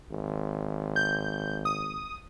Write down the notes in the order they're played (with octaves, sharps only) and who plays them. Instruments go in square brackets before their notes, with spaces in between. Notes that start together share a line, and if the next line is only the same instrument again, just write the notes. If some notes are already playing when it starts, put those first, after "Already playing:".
[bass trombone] G#1
[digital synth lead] G6
D#6